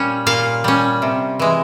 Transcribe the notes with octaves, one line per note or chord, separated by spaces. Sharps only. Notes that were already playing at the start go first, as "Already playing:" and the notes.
Already playing: A#2 G3 C#4
A#2 F5
G3 C#4
C3
E3 G#3